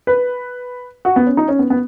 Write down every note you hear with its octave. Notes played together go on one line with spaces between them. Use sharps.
B4
F#4
B3
C#4
D#4
C#4
B3
B3